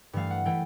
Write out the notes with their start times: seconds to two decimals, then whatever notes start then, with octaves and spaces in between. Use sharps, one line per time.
0.13 G2 E3 A3 F5
0.30 F#5
0.45 E3 A3 G5